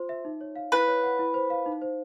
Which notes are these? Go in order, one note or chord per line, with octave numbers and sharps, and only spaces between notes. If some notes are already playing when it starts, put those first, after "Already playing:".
Already playing: F4 C5 C6
E5
D#4
C#5
F5
E4 B4
C#5
F#5
E4
C5
F5
D#4
C5